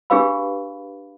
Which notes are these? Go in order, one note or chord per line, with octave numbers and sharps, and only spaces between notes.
D4 G4 G#4 B4 F5 B5